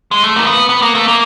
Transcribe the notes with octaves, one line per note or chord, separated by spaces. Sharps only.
G#3
A3
A#3
B3
B3
A#3
A3
A#3